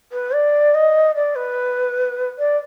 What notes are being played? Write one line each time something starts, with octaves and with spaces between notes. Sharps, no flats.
B4
D5
D#5
D5
B4
D5